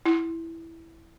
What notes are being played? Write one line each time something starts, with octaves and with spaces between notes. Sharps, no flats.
E4